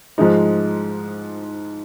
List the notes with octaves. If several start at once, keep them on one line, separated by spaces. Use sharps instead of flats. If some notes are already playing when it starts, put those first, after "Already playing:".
G#2 F3 G#3 D#4